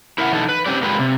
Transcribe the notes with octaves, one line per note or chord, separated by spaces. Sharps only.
E4 A#4 E5 F#5
E3 D#4 A4
B4
C4 C#4 G4 D5
G#3 A#3 F4 G4 B4
C3